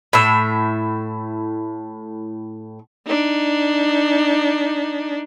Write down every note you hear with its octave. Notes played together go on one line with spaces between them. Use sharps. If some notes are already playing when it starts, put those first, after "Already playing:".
A2 E5
D4 D#4